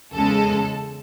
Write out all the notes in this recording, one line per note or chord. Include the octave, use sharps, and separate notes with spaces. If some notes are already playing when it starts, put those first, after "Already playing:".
E2 C#3 G#3 A4